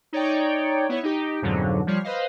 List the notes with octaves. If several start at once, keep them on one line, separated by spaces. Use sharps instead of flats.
D#4 C#5 D5 G5
B3 E4 C#5
D#4 G4
F2 G#2 B2 D3 F#3
F3 G3 C#5 F6 C7
B4 C5 D#5 F5